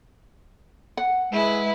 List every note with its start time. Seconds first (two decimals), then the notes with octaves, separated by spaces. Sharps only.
0.97 F#5
1.31 G#3 E4 B4